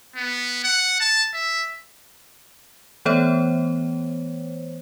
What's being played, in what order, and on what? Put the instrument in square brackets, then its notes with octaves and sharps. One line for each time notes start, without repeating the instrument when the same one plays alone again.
[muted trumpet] B3
F#5
A5
E5
[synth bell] E3 A3 B3 C5 C#5